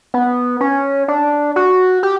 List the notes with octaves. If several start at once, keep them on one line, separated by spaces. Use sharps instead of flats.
B3
C#4
D4
F#4
G4